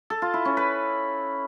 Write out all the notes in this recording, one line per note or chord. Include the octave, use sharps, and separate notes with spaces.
A4
F4
E4
C#4
B4